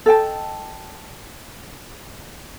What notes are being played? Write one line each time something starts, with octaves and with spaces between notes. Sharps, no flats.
A4 D#5 G5 A5